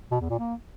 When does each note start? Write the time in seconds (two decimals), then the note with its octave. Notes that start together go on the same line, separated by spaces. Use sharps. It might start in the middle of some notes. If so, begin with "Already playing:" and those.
0.11 B2
0.21 E2
0.30 A#2
0.39 A#3